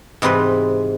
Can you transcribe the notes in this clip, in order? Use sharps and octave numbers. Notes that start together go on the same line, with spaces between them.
G#2 C3 E3 B4 C6